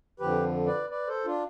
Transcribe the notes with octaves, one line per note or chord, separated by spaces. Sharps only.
F2 D3 F3 G4 B4
B4 D5
B4 D5
A4 C5
D4 F4